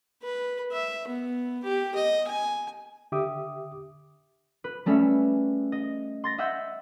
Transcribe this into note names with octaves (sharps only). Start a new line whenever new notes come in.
B4
E5
B3
G4
D#5
G#5
D3 G4 E5 D6 D#6
B4
G3 A3 C#4 G#4 E5
D#5
C6 A6 A#6
D#5 E5 F#5 E6 G6